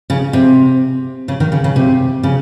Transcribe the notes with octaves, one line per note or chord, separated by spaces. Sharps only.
C#3
C3
C#3
D#3
C#3
C#3
C3
C#3